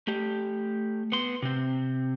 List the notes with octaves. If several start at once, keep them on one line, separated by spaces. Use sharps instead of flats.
A3 G4
B3 C6
C3 C4